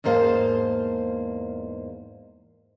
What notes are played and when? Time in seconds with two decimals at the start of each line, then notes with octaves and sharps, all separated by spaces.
0.04 E2 G#2 A#3 C5 F5 A5